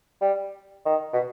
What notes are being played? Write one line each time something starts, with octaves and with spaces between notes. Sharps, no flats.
G3
D#3
B2